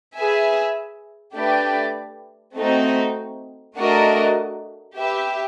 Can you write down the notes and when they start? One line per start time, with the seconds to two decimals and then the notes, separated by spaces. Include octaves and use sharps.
0.16 G#4 B4 E5 G#5
1.36 A3 D4 G4 B4 D5
2.56 A3 C4 D#4 F#4
3.76 A3 D4 F#4 A#4 D#5
4.97 G4 B4 E5